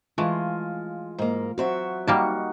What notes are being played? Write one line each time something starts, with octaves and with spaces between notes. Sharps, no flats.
E3 G#3 A3 F4
G#2 A#3
F#3 C4 F#4 E5
G3 A#3 D#4 F#4 A5